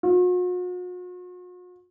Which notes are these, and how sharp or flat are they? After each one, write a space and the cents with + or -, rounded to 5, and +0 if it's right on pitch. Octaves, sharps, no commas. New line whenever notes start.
F#4 -45